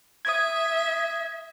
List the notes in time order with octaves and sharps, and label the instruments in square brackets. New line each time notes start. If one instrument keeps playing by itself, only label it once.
[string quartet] E5 [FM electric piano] D#6 G#6